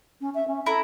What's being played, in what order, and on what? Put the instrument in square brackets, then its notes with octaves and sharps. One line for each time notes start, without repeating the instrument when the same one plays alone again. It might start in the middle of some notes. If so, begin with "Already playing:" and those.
[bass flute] C#4
E5
C#4
[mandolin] E4 A#5 [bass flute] A4